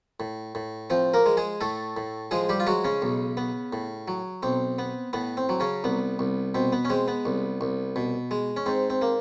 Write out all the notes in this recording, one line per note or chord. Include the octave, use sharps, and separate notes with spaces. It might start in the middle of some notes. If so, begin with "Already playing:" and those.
A2
A2
F3 C4 C5
A#3 A#4
G#3
G#3 G#4
A2 A3 A4
A2
F3 G#3 G#4
G3 G4
F4
F#3 G#3 F#4
C#3 C#4
B1
B3
A2
F#3
B1 C4
B3
A2 B3
C4
F#3
C#3 C#4
C2 B3
C2
B2 C4
B3
C#4
G#3 C4
B3
C2
C2
B2
G#3
C#4
G#2 C4
C4
A#3